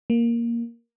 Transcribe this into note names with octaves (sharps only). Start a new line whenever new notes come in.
A#3